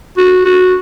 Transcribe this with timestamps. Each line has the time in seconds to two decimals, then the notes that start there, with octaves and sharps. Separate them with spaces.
0.17 F#4
0.45 F#4